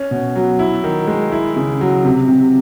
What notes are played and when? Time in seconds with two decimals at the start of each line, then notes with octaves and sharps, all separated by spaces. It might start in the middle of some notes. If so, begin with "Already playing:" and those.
Already playing: C#4
0.11 B2
0.36 F#3
0.59 E4
0.84 D#3
1.07 G#3
1.32 E4
1.56 C#3
1.81 F#3
2.05 C3
2.28 C3